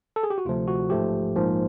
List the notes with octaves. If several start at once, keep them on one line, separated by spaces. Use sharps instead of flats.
A4
G#4
G4
F#4
D2 C3 F3 A3 F4
F#4
A1 G#2 F3 A3 G4
A#1 G#2 F3 A#3